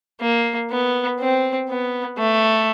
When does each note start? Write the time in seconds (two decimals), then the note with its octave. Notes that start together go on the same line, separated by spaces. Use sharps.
0.21 A#3
0.71 B3
1.20 C4
1.69 B3
2.18 A3